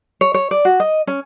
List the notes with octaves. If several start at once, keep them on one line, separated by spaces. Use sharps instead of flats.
C#5
C#5
D5
F#4
D#5
C#4